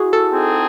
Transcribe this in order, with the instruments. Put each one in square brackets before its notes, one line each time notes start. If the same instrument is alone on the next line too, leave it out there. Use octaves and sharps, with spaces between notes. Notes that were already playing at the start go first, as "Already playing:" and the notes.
Already playing: [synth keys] E4 F#4 G#4
A4
[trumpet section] C4 D#4 G#4